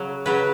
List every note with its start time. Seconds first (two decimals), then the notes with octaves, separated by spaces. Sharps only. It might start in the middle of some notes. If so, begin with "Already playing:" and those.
Already playing: C#3 F#3
0.26 C#3 F#3 B4